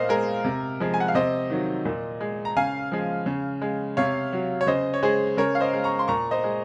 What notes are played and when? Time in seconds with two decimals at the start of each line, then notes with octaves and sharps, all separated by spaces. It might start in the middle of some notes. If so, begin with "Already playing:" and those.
Already playing: A#2 C5 D#5 F5
0.09 G#3 A#4
0.44 C3
0.80 F3 G#3
0.94 G#5
1.00 F#5
1.08 F5
1.15 C3 C5 D#5
1.50 D#3 F#3
1.85 A#2
2.21 G#3
2.45 A#5
2.56 C#3 F5 G#5
2.92 F3 G#3
3.26 C#3
3.62 G#3
3.97 C3 C#5 F5
4.33 F#3
4.61 C#5
4.67 C#3 C5 D#5
4.94 C#5
5.03 G#3 G#4 C5
5.37 C#3 A#4 C#5
5.55 F5
5.60 C5 D#5
5.73 G#3
5.84 A#5 C#6
5.99 C6
6.08 A#2 A#5 C#6
6.31 C5 D#5
6.44 G#3